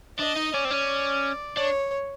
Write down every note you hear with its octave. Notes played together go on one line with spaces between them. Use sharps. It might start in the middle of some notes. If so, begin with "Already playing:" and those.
D4 D#5
D#4
C#4 D5
C4
C#4
D4 C#5